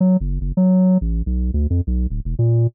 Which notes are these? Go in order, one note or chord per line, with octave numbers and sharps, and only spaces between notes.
F#3
F#1
F#1
F#3
A1
B1
D2
F2
B1
D1
E1
A#2